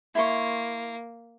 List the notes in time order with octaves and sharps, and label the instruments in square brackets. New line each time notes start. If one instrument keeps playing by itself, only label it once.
[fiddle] A#3 [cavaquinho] E4 C6 C#6